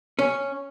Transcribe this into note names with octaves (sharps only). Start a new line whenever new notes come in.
C#4